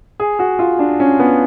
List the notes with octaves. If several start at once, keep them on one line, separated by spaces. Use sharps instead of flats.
G#4
F#4
F4
D4
C#4
B3